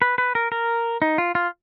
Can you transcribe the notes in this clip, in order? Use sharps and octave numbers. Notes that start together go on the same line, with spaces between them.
B4
B4
A#4
A#4
D#4
F4
F4